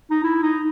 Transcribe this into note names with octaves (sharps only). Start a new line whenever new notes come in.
D#4
E4
D#4